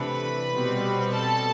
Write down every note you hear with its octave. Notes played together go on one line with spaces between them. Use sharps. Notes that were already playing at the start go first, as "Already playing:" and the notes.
Already playing: C3 E3 A3 D4 B4 B5
B2 G3 C4
A4 A5